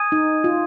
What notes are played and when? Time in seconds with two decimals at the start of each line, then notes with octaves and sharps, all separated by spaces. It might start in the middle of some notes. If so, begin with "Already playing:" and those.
Already playing: G#5 D#6 G#6 D#7
0.12 D#4
0.44 F4